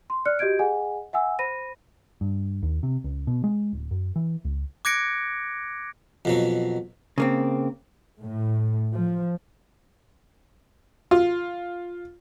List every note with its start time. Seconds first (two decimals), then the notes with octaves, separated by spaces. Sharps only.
0.10 C6
0.25 D5 F6 F#6 C#7
0.39 F#4 G4 D#5 G6 G#6 D7
0.59 G#4 D#5 F#5 G#5
1.13 E5 F#5 G#5 E6
1.39 C5 B5 A#6 D#7
2.21 G2
2.63 D#2
2.83 C3
3.04 C#2
3.27 B2
3.44 G#3
3.73 D1
3.91 F#2
4.16 E3
4.45 C#2
4.85 D6 F#6 G#6 A#6 C#7 D7
6.25 F2 B2 F#3
7.18 C#3 A#3 C4
8.22 A2
8.95 F3
11.11 F4